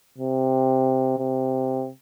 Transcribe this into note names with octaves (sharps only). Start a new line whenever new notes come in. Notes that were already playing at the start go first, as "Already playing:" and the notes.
C3
C3